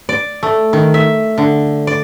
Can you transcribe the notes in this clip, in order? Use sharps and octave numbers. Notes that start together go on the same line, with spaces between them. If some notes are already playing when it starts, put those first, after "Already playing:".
D5
A3
D#3
E5
D3
D5